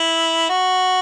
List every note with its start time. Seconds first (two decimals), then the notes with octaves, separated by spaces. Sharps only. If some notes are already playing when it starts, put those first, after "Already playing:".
Already playing: E4
0.50 F#4